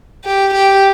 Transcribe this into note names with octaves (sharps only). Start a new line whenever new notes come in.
G4
G4